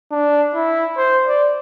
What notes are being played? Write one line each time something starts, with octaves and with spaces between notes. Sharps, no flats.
D4
E4
C5
D5